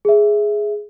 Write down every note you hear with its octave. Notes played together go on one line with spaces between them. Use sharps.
G#4 E5